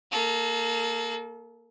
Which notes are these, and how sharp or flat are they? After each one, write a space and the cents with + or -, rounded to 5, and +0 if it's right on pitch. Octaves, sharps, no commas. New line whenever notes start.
A#3 -10 A4 -35